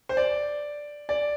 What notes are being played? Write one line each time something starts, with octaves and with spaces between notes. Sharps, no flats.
C5
D5
D5